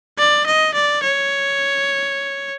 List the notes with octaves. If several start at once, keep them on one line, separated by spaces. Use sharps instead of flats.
D5
D#5
D5
C#5